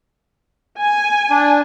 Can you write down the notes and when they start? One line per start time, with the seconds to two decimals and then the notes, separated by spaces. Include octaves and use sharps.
0.80 G#5
1.30 D4